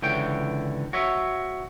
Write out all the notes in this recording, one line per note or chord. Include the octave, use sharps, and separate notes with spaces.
C#2 D3 E3 C#5 G5
F#4 C#5 E5